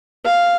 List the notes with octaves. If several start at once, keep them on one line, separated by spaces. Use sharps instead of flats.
F5